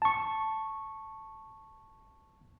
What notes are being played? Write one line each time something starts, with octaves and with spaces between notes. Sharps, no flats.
A5 C#6